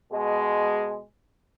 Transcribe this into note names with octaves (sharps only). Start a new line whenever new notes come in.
B2 G#3